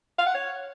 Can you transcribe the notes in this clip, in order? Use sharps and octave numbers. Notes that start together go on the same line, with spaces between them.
F5
F#5
C#5